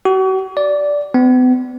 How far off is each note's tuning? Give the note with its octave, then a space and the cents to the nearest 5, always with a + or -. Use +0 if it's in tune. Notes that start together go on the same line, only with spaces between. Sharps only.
F#4 +40
D5 -10
B3 +40